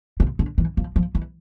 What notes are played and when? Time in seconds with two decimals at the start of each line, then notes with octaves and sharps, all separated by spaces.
0.20 C3
0.39 D3
0.58 E3
0.77 F3
0.96 F3
1.15 E3